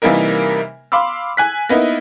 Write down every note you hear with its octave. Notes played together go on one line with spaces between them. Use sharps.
C3 E3 G3 A#3 D#4 A#4
F5 B5 C6 D6 E6
G#5 F#6 B6
A#3 B3 D#4 E4